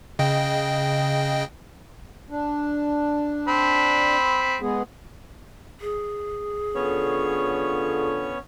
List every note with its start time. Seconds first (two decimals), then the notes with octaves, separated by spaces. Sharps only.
0.19 C#3 D#5 G5
2.30 D4
3.48 C4 B5
4.61 G#3 B3 G#4
5.81 G#4
6.75 D3 B3 C#4 F4 A4 C#5